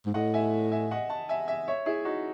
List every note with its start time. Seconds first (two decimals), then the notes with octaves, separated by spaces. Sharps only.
0.06 G#2
0.14 A2 D#5 F#5
0.34 E5 G#5
0.72 E5 G#5
0.91 D#5 F#5
1.10 F#5 A5
1.29 E5 G#5
1.48 E5 G#5
1.68 C#5 E5
1.86 E4 G#4
2.05 D#4 F#4